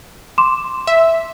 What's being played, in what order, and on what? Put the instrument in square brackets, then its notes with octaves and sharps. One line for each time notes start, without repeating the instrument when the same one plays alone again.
[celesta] C6 D6 E7
[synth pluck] E5